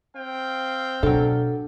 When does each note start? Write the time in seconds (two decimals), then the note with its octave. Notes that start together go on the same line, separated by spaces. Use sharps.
0.14 C4 F5 G5
1.03 B2 F#3 D4 A4